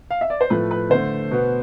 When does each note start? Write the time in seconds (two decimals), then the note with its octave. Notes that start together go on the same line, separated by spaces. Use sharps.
0.11 F5
0.21 E5
0.30 D5
0.41 C5
0.50 A2 F3 A3 B4
0.71 B4
0.90 D3 A3 C5
1.31 B2 B3